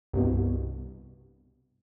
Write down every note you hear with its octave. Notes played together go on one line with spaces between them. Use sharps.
C2 G2 B2